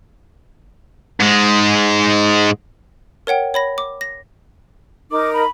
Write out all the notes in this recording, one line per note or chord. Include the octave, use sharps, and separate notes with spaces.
G#2 G#3
A#4 C#5 F#5 G5
C#5 B5 A#6
D6
A#6
D#4 A#4 D6
B5